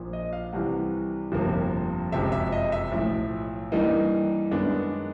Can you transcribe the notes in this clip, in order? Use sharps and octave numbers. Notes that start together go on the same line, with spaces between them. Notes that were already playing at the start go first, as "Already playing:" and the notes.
Already playing: A#1 A#2 F3
D#5
F5
C2 C3 E3 F#5
G1 F2 C3 F3 A#3
F#1 F2 C3 F3 G#3 E5
E5
D#5
E5
B1 A2 F3
G2 E3 G3 A#3 D#4 D#5
F#2 D#3 G#3 B3 D4